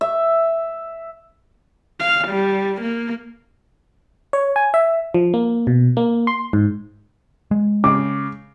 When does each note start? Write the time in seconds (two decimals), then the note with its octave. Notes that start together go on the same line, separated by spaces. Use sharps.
0.01 E5
2.00 F5
2.28 G3
2.82 A#3
4.33 C#5
4.56 G#5
4.74 E5
5.14 F3
5.34 A#3
5.67 B2
5.97 A#3
6.27 C6
6.53 G#2
7.51 G#3
7.84 C#3 D6